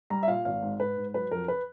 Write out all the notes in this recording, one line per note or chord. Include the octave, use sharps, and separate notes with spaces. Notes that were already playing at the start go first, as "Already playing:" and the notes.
G3 A#5
E5
A#2 F5
G#1 F5
G#2
G#2 B4
G#2
F#3 B4
F2 A#4
B4